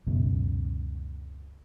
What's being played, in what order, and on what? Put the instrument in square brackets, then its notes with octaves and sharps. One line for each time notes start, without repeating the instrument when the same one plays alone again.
[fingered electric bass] C#2 F#2 B2